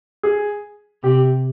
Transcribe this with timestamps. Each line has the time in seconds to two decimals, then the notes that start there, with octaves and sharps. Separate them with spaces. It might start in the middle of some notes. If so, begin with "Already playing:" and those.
0.23 G#4
1.03 C3 G4